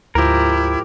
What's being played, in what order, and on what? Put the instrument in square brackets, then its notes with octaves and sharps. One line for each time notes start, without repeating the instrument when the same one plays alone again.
[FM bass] D2 [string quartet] G#2 F3 [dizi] E4 [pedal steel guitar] G4 A#4